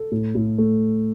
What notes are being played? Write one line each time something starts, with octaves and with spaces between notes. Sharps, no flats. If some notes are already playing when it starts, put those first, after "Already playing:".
Already playing: A4
A2
A2
A3